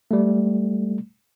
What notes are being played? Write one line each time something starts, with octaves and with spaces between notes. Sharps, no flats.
G3 A3